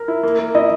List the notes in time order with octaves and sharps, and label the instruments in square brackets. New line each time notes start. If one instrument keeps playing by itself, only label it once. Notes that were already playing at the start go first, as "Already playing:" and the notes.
Already playing: [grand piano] A#4
E4
A#3
A#3
[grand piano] E4 [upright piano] D#5